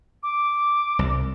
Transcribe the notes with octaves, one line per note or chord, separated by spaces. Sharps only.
D6
C2